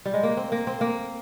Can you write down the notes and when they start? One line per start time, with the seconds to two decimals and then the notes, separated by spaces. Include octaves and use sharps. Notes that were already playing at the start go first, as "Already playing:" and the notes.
0.06 G3
0.14 G#3
0.23 A#3
0.37 C4
0.52 A#3
0.67 C4
0.81 A#3